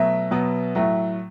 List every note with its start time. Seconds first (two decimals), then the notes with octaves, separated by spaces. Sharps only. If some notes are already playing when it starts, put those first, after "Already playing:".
Already playing: B2 F#3 A3 E5
0.31 B2 F#3 B3
0.75 A2 F#3 A3